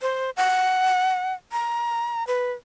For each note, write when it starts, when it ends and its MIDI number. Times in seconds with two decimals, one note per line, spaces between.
0.02 0.30 72
0.37 1.33 78
1.52 2.26 82
2.27 2.53 71